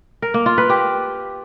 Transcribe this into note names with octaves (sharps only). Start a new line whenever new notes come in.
A#4
A#3
F4
B4
G4